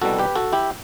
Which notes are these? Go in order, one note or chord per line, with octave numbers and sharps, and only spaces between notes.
C2 B2 G3 F#4 A4
G4 B4
F#4 A4
E4 G4